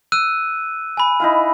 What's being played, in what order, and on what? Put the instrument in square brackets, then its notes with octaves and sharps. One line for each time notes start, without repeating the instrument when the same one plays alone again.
[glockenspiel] E6 F#6 D#7
G#5 B5
[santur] D#4 E4 F5